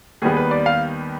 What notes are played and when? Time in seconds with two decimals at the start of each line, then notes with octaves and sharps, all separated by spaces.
0.22 D#2 D#3 G3 B3 G#4
0.37 B4
0.51 D5
0.66 F5